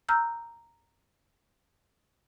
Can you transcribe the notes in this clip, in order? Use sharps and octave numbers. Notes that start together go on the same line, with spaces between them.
A#5 E6 F6 G6